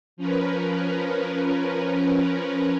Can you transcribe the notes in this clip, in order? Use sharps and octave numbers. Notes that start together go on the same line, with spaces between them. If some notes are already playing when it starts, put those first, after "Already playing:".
F3 C#4 A#4 B4